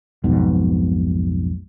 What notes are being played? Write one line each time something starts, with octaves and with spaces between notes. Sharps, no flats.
B1 F2 G#2 B2